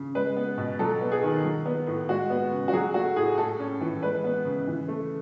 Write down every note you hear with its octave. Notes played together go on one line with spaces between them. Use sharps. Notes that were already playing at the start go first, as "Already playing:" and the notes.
Already playing: C#3
G#3 B4
B3
B2
F#3 A4
B3
G#4
D#3
F#3
B3
A2
G#3 F#4
B3
C#3
F#4
F#3 G#4
A3 F#4
A2 G#4
A3 A4
C#4
E3
G#3 B4
B3
C#3
E3
A3